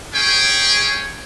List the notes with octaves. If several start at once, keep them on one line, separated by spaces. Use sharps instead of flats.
C#4 G#4 C#5 G5